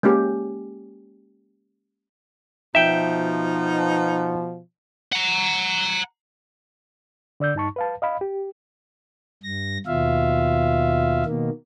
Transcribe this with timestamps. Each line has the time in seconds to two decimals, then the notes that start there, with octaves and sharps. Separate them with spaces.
0.03 G#3 A#3 C#4 G4
2.75 B2 F3 D#4 E5 G5
5.12 F#5 A#5
7.40 D3 D5 E6 G6
7.55 G2 D#4 A5 C#6
7.76 B4 F5 A5
8.02 D#5 F5 B5
8.21 G4
9.43 G2 A#6
9.87 D#2 B2 F4 E5 F5
11.26 B2 D#3 A#3